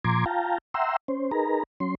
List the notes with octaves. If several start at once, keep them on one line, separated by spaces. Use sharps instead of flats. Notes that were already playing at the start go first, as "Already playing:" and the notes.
A#2 F3 A#5 C6 D6 G#6
F4 F5 G5 A5 A#5
E5 F#5 G5 A#5 C6 E6
C#4 C5
D#4 G#4 A#4 B4 A#5
F#3 C#4 C6